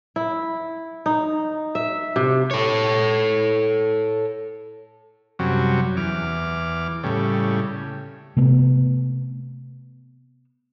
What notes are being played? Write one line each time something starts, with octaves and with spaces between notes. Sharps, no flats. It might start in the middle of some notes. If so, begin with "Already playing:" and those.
E4
D#4
E5
C3
A4 C#5
F#2 C3 F#3 G3 C#4
E2 D6 F6
A2 C#3 G3
C3 A3 B3